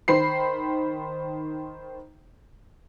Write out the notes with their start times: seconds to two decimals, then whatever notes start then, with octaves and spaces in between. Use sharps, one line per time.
0.08 D#3 C5 B5 C7